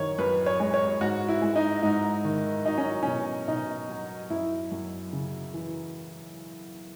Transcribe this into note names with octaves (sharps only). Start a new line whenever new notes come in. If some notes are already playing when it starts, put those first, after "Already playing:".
Already playing: F#2 D#3 C#5
F#2 B4
C#5
G#3
C#5
G#2 F#4
E4
G#3
D#4
G#2 D#4
D#3
F#3 D#4
C#4
B2 C#4
B2 D#4
F#3
F#2 E4
F#2
C#3
E3